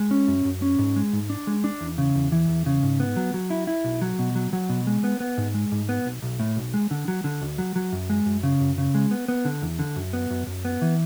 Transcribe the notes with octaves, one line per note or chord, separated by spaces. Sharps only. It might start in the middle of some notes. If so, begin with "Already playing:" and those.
Already playing: G#3
C#4
F#2
F#2
C#4
G#2
G#3
G#2
D4
G#3
D4
E2
C#3
E2
E3
E2
C#3
G#2
B3
F#3
F#3
E4
E4
B1
F#3
B2
F#3
F#3
B2
G#3
B3
B3
G#2
G#3
G#2
B3
B1
B1
A2
B1
G#3
D3
F#3
D3
D2
F#3
F#3
F#2
G#3
F#2
C#3
F#2
C#3
G#3
B3
B3
D3
E2
D3
F#2
B3
F#2
F#2
B3
E3